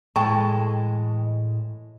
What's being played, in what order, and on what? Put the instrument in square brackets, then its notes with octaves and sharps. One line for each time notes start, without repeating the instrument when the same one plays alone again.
[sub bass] A2 [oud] E3 G#3 A4 [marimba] G5 C#6 [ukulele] A5